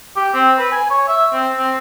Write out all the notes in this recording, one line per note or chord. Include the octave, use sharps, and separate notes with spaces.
G4
C4
B4
G#5
C#5
E5
C4
C4